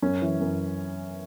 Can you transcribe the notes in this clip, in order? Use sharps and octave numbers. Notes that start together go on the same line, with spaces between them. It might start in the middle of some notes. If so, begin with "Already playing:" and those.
F#2 C#4
E3
F#2